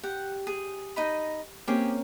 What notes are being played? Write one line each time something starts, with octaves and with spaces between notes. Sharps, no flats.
G4 F#5
G#4
D#4 D#5 B5
A#3 C4 C#4 G4 G#4